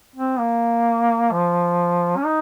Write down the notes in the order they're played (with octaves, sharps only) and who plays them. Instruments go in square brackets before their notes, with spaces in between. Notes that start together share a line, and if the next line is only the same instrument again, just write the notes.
[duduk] C4
A#3
F3
C#4
D#4